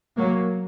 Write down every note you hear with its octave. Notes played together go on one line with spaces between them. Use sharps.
F#3 A#3